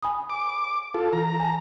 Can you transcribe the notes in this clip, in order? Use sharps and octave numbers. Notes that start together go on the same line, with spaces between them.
G#5 B5 D#6
D6
F4 A4
E3 A#5
G#5 A5